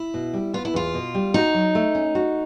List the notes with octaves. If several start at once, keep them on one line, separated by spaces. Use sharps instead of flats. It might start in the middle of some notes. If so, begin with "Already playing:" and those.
Already playing: E4
B2
G3
B3 F4
E4
E2 F4
B2
G3
D#4 F#4
F#3
A3
C#4
F#4